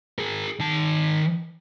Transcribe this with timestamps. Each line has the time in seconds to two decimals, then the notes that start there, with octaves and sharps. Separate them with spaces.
0.19 G#4 A#4
0.60 D#3 A5